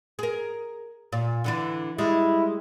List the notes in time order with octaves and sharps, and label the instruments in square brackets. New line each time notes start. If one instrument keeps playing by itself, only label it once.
[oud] G#4 A#4
A#2
D3 E3 D4
[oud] G3 G#3 [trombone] E4